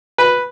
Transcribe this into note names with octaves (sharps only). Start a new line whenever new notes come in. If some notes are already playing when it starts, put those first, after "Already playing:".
B4